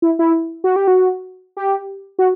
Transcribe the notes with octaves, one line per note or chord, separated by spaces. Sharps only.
E4
E4
F#4
G4
F#4
G4
F#4